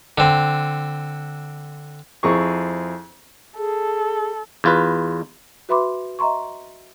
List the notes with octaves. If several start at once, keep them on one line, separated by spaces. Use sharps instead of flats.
D3 C4
F2 C4 E4 G#4 A#5 C#6
G#4 A4
E2 F4 B4
F#4 B4 E5 B5 C6 D6
D#5 E5 A#5 C6 C#6